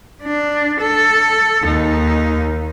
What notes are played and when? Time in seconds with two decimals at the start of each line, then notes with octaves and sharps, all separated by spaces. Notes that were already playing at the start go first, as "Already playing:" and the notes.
0.23 D4
0.81 A4
1.64 D#2 D#4